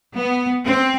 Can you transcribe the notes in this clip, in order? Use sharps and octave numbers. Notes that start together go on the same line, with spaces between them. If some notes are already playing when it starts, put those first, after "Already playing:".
B3
C4